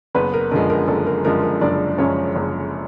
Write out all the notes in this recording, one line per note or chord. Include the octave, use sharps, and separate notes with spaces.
F#1 B3 B4
A#4
F#2 D3 F3 G#3 A#4
A#4
F#1 A4
A#4
F#2 D3 F3 G#3 A#4
A#4
F#1 D4 D5
F#2 D3 F3 G#3 C#4 C#5
F#1